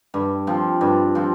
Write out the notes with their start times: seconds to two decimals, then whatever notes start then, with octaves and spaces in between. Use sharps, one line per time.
0.14 G2
0.47 F3 C4
0.81 G2
1.15 F3 C4